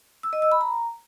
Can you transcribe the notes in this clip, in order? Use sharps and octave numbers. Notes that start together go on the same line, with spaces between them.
E6
D#5
E6
B5
A#5